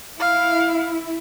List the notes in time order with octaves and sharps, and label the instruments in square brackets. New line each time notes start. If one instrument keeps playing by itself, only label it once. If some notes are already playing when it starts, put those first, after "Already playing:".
[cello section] E4 [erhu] F5